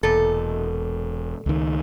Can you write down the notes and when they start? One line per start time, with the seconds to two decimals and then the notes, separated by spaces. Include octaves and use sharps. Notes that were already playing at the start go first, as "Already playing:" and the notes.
0.03 E1 A#2 A4
1.46 C#2 D#3